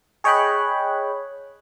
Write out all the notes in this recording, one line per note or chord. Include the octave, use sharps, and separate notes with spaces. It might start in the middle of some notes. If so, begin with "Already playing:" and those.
G#4 C#5 D#5 G5 B5 F#6